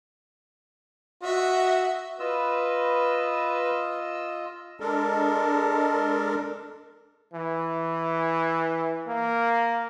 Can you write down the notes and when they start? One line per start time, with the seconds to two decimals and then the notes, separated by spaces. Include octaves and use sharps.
1.22 F#4 D#5 E5
2.20 F4 B4 D#5 E6
4.80 G#3 D4 A4 A#4
7.34 E3
9.07 A#3